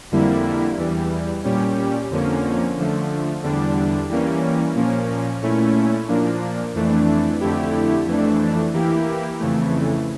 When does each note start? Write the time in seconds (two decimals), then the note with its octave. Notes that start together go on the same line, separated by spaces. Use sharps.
0.11 F2 D3 G3 A#3 E4
0.77 E2 E3 G3
1.44 A#2 G3 C#4 G4
2.10 F2 D3 F3 A#3 C#4
2.77 D3 F3 A3
3.43 E2 D3 G3 D4
4.09 E3 G3 A#3 C#4
4.75 A#2 F3 A#3 C#4
5.42 A#2 A3 C#4 E4
6.08 A#2 F3 A#3 D4
6.74 F2 E3 A3 D4
7.41 F2 D3 A3 E4 G4
8.07 F2 E3 A3 D4
8.74 E3 A#3 E4 G4
9.39 F2 C#3 E3 A3